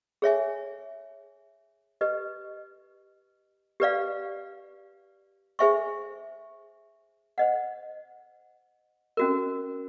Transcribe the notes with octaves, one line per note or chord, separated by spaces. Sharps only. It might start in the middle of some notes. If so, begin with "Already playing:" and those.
G#4 C#5 E5 G#5
G4 B4 D#5
G4 B4 D5 F5
G#4 C5 E5 G#5 C#6
C5 D#5 F#5
C#4 F#4 A#4